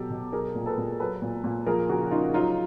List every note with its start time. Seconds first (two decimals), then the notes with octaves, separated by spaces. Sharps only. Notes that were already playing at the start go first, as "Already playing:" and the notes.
Already playing: B2 F#3 G4 A4
0.10 B2
0.32 F#3 G#4 A#4
0.55 A#2
0.66 A4 B4
0.78 A#2
1.00 F#3 A4 B4
1.22 A#2
1.44 A#2
1.67 F3 G#4 A#4
1.89 C#3 F#4 G#4
2.11 C#3 D#4 F4
2.34 F#3 D#4 F4